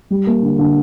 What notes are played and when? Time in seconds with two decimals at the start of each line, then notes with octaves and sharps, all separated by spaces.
0.10 G3
0.27 A#3
0.42 D3
0.59 D3